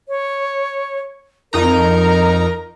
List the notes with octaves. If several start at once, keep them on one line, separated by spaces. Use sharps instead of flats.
C#5
F2 D#4 A#4 A#5